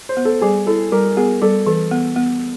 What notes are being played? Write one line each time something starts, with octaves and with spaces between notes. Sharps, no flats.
C5
B3
A4
G3 G#4
E4 A4
G3 A#4
B3 G#4
G3 A4
E3 A4
B3
B3